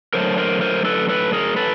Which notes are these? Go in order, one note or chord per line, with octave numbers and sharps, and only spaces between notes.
D3 F#3 A3 A#4 C5
A#4 C5
A#4 C5
A4 B4
A4 B4
G#4 A#4
A4 B4